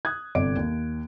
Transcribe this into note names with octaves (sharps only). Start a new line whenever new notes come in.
D#6 F#6 G#6
G1 C3 D5 D7
D#2